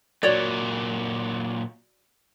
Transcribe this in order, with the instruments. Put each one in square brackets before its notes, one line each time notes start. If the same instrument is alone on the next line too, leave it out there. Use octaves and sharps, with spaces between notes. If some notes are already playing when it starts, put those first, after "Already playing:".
[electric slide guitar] A#2 F#3 [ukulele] F#4 C#5 D5